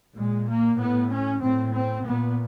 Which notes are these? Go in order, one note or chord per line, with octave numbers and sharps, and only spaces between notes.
A#2 G#3
A#3
A2 B3
C#4
A2 C4
C4
A#2 B3